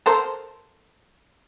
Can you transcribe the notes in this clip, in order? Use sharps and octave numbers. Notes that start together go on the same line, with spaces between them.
A4 A#4 C5